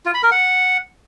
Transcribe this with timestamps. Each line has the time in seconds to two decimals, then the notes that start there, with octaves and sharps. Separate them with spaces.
0.06 F4
0.14 B5
0.23 A#4
0.31 F#5